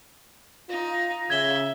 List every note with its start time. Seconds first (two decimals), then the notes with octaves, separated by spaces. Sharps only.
0.69 D#4 F4
1.30 C#3 E5 G#6 G7